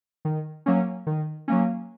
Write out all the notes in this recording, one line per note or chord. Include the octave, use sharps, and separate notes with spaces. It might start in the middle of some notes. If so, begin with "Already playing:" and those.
D#3
F#3 A#3 C#4
D#3
F#3 A#3 C#4